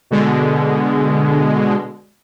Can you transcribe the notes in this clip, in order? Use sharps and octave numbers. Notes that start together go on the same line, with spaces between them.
B2 D3 G#3